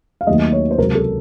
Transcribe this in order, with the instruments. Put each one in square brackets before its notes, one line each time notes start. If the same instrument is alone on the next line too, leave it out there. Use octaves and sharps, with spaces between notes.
[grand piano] F5
D#2 D#3 F#3 A3 D#5
C#5
C5
C#2 C3 F#3 A#4
A4